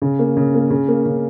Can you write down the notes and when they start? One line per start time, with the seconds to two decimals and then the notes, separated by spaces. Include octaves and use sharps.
0.02 C#3
0.19 A#3
0.37 C#3
0.54 A#3
0.70 C#3
0.88 A#3
1.06 C#3